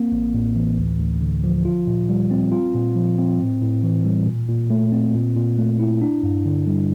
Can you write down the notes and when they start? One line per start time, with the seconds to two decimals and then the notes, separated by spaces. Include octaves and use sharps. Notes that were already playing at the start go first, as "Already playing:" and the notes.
Already playing: A#3 C4
0.12 A1
0.34 A2
0.56 E3
0.78 D2
0.99 D2
1.21 D3
1.44 F3
1.65 F4
1.87 A#2
2.09 G3
2.31 C4
2.52 F4
2.74 A#2
2.96 F3
3.18 C4
3.39 A2
3.61 A2
3.83 E3
4.05 G3
4.27 A#2
4.49 A#2
4.70 A3
4.92 C4
5.14 A#2
5.36 A#2
5.58 A3
5.80 E4
6.01 D4
6.23 G2
6.45 D3
6.67 G3